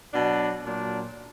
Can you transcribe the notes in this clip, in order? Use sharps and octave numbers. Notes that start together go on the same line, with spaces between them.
B2 F#3 D4
A#2 F#3 D4